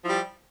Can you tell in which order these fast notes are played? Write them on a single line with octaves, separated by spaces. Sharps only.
F3 E4 G3